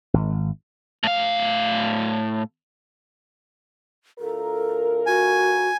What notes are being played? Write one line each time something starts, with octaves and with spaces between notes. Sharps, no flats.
G#1
A2 F5
D2 F4 A4 A#4
F#4 G#5